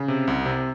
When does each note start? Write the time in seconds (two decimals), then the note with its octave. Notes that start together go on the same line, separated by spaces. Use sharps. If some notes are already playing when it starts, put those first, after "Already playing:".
Already playing: C#3
0.08 C3
0.27 C2
0.46 C3